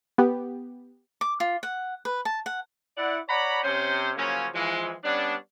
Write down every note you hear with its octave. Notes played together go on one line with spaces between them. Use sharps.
B3 G4
D6
F4
F#5
B4
A5
F#5
E4 D5 F#5
C#5 D5 F#5 A#5 B5
C3 C#4 C5
C#3 F3 F#3 A#3 C#4
E3 F3 G#3
G3 B3 C#4 D4